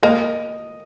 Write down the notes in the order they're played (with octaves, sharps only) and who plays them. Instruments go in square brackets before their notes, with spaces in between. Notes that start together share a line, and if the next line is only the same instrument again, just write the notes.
[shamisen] A#3 [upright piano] D#5